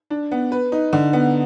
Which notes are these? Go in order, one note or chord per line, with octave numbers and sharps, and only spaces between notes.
D4
B3
B4
D#4
D3
B3